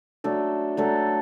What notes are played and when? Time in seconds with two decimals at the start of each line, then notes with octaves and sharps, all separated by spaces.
0.24 F#3 A3 D4 A4
0.77 F#3 A3 D4 A4